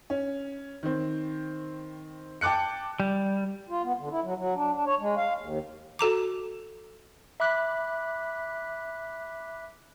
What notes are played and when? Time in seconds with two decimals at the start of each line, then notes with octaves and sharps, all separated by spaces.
0.10 C#4
0.83 D#3 C4
2.41 G5 A5 D6 F#6 C#7
3.00 G3
3.69 F4
3.83 B3
3.99 D3
4.11 E4
4.22 F#3
4.37 F#3
4.55 D4
4.73 D4
4.86 C#5
5.00 G#3
5.17 F5
5.38 D#2
5.99 F#4 A4 A#5 D6
7.40 E5 B5 D6 F#6 B6